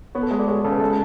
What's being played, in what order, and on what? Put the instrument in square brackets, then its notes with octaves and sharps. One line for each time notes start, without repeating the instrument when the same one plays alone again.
[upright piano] B3 [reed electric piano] C#5
[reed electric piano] A4
[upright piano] G#3
[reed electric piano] D5
[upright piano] G#3 [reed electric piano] C#5
[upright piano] C#3 [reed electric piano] A4
[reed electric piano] B4
[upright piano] G#3 [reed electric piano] A4